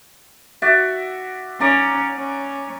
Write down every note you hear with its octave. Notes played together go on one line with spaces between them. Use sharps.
F#4 D5 E5
C#4 D5 A#5 D6
C#4